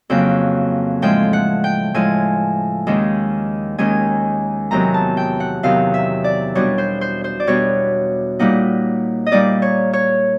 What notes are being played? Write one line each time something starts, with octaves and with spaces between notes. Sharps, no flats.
F2 C#3 F#3 A#3 G5
A2 F3 G#3 G5
F#5
G5
A2 F3 G#3 G#5
D#2 D#3 G#3 C#4
D#2 D#3 G#3 C#4 G#5
E2 C3 D#3 F#3 B3 A#5
A5
G5
F#5
E2 C3 D#3 F#3 B3 F5
E5
D5
B2 G3 B3 D4 C#5
C5
C5
C5
D5
B2 G3 B3 D4 C#5
A#2 G3 A#3 D#4 F#5
D#5
A#2 G3 A#3 D#4 D5
C#5
C#5